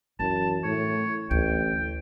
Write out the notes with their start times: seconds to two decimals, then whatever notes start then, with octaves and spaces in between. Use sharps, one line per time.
0.19 F#2 E3 A5
0.64 A2 C#5
1.31 A1 D2 G5